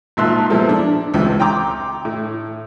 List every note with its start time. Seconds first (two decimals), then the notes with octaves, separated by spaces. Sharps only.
0.17 G#1 A#2 E5 A5 C6 F#6
0.50 A#2 F3 G#3 B3 E4 A4
0.69 D4
1.14 C#2 C3 E3
1.40 G5 A#5 C6 D6
2.05 A2